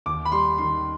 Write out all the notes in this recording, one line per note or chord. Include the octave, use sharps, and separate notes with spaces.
D#2 D6
B5
G3 C6
D#3 C6